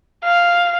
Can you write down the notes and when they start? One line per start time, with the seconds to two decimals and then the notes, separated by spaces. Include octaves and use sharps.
0.24 F5